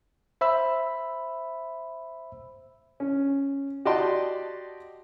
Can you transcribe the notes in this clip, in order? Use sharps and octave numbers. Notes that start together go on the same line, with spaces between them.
C5 E5 B5 E6
C#4
F#4 G4 D5 D#5 A5 C6